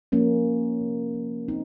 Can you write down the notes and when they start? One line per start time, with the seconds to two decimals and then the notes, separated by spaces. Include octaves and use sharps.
0.12 F3 A#3 C#4
0.46 F3
0.81 C3
1.14 F3
1.48 A#3 C4 D#4